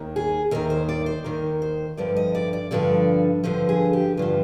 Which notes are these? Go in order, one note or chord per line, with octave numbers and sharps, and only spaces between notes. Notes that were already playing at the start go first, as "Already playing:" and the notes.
Already playing: D#2 D#3
G#4
D#2 D#3 A#4
C5
D5
C5
D#2 D#3 A#4
C5
G2 D3 F3 D5
D#5
D5
D5
G2 D3 F3 D5
G2 D3 F3 C5
G#4
G4
G2 D3 F3 F4